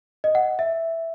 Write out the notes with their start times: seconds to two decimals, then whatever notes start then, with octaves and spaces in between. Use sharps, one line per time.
0.24 D#5
0.35 F#5
0.59 E5